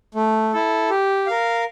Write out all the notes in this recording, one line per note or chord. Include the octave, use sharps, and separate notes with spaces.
A3
E4 A4
G4
A#4 F5